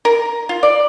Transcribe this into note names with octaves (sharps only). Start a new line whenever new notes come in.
A#4
F4
D5